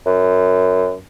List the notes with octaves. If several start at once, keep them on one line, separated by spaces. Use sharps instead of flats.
F#2